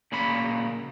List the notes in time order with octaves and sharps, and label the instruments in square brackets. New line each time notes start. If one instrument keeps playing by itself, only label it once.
[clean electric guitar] A#2 C#3 A#3 B5